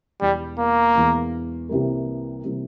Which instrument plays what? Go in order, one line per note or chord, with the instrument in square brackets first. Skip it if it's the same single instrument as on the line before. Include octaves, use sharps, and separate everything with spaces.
[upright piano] E1 E2 E3 [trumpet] G3
[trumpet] A#3
[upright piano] E1 E2 E3
C2 C3 E3 G3 A#3
C3 E3 G3 A#3